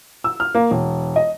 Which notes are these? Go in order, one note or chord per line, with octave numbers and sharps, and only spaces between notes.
E6
F6
A#3
E1
D#5